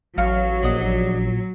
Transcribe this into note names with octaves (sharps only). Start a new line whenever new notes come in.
A1 F#3 F5 C#6
A#1 D5 D#5 F#5